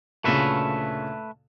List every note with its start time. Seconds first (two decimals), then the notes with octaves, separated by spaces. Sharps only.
0.24 D2 A#2 C#3 A3 B4 E5